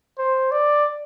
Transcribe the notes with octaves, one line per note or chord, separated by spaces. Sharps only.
C5
D5